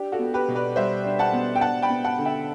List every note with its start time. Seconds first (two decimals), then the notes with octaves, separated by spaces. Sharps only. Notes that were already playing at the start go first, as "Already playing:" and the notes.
Already playing: D4 G4
0.12 F#4 A4
0.19 B3
0.34 G4 B4
0.48 B2
0.55 B4 D5
0.76 G3 C5 E5
1.05 D4
1.19 F#5 A5
1.33 B3
1.55 G5
1.61 D4 F#5 A5
1.82 G5 B5
1.90 B3
2.04 F#5 A5
2.19 D3
2.25 E5 G5